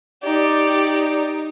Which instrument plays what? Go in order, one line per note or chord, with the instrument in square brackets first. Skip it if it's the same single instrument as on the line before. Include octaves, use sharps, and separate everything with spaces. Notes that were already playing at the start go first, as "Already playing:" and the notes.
[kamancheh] D#4 [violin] G4 [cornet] D5